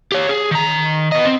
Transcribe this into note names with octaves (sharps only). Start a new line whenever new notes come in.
G4 C#5
G#4
D#3 A#5
B3 D#5
C4